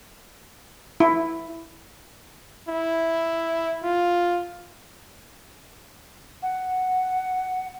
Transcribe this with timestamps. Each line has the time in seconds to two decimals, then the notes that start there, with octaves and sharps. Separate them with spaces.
1.00 E4
2.68 E4
3.84 F4
6.42 F#5